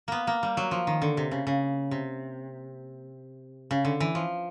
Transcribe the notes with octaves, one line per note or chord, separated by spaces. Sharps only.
A#3 B3
A#3
G3
F#3
F3
D#3
D3
C3
C#3
C#3
C3
C#3
D3
E3
F3